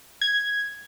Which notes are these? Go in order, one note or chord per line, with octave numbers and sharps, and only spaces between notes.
G#6